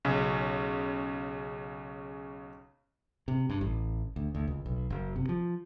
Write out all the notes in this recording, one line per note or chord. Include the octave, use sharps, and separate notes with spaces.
B1 C#3 C#4
C3
G2
A1
D2
D2
C#2
B1
F#1
C3
F3